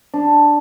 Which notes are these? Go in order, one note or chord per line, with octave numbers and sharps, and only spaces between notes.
D4